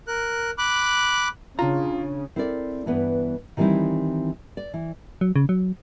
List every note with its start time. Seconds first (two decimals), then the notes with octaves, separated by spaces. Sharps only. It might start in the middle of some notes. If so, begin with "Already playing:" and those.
0.08 A#4 F#6
0.58 B5 D6 F#6
1.59 C#3 D4 F4 A#5
2.36 C4 E4 A4 A#4 C5 D5
2.86 G2 E3 B3
3.57 D#3 E3 G3 C4 D#4 E4
4.57 D5
4.74 E3
5.21 F#3
5.36 C#3
5.49 F#3